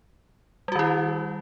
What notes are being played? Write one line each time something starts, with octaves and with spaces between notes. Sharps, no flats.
D#3 G3 E4 F#4